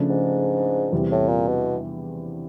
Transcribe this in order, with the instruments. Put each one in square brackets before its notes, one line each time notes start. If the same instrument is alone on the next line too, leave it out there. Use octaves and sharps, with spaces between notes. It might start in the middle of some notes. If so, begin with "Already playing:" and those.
Already playing: [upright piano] C#3 F3 A3 D4
[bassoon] G#2
[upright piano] E2 C3 E3 G3 C4
[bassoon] A2
A#2
B2